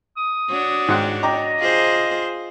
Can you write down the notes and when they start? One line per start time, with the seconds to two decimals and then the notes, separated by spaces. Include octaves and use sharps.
0.17 D#6
0.50 D4 F#4 C#5
0.88 G#2 F#5 G5
1.23 D#5 G5 A#5 D6
1.59 F4 G#4 C5